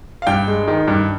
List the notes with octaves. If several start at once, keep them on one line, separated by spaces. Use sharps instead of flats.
F5
G2 G5
G#3
D#3
G2